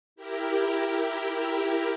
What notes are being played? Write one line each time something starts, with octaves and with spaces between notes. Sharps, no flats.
E4 G4 A#4